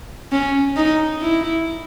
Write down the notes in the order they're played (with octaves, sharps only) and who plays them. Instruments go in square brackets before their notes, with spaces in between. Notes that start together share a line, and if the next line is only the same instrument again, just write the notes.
[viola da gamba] C#4
D#4
E4